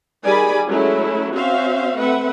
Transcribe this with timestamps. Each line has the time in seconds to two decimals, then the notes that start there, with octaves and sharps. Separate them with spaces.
0.24 D#3 G3 G#4 D5 G#5 B5
0.67 F#3 G#3 A3 C#4 E4
1.34 C4 C#4 F#4 C5 E5 F5
1.98 A3 C4 B4 E5 F#5